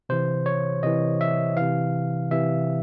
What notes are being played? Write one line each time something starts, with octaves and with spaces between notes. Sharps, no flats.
C3 E3 C5
C#5
C3 E3 D#5
E5
C3 E3 F5
C3 E3 E5